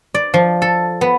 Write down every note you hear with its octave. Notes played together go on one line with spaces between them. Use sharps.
D5
F3
A4
B3